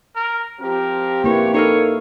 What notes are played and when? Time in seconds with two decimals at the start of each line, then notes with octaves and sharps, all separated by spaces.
0.16 A#4
0.61 F3 C4 G4 A#4
1.24 A#3 E4 B4 C#5
1.54 D#4 A4 A#4 C#5